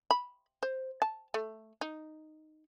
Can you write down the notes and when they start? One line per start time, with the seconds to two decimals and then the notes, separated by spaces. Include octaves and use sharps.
0.11 B5
0.63 C5
1.02 A5
1.34 A3
1.81 D#4